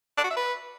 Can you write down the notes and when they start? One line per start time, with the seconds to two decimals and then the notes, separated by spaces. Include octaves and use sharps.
0.18 D4
0.24 F#4
0.30 E5
0.37 B4